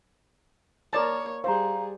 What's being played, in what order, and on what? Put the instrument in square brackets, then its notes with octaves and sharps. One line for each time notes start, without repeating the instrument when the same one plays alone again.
[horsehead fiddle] A#3 C#5 [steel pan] A#4 D5 A5
[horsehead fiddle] G3 G#4 [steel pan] C5 [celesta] F5 A#5